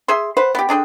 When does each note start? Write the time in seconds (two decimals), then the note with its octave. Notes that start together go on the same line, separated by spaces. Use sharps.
0.08 G#4 E5 C6
0.37 B4 C5 F#5
0.55 B3 G4
0.69 D3 D4 G#4 G5